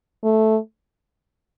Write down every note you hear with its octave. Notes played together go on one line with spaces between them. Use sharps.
A3